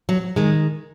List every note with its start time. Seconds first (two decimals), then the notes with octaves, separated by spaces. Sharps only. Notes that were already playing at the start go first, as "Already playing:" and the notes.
0.09 F#3
0.36 D#3 G#3